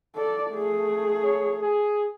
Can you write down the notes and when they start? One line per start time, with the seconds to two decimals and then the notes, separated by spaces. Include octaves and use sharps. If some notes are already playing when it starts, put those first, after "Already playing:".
0.15 A4 D5
0.51 A3 G#4
1.23 C#5
1.62 G#4